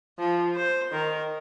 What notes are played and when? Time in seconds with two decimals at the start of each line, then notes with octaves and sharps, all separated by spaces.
0.19 F3
0.56 C5
0.92 D#3 A#4